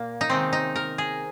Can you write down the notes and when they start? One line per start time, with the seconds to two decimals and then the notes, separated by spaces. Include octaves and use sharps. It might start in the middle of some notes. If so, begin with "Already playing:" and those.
Already playing: A#2 A#3
0.21 D#4
0.30 C3 D#3 G#3 C4
0.53 D#4
0.76 A#4
0.98 G#4